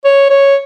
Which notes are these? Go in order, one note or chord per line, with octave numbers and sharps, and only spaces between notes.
C#5
C#5